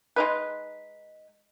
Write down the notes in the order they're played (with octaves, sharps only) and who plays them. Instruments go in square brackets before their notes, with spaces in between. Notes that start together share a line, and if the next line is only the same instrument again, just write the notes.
[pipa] G#3 D#4 B4